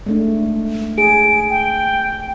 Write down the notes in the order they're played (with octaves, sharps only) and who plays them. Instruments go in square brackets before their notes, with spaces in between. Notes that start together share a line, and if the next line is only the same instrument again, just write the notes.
[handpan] G#3 A3 D4
[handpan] G#4 [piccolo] D7
[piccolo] G5